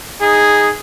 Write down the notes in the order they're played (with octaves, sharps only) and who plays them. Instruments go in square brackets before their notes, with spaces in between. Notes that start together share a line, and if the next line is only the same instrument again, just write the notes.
[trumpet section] D#4 G#4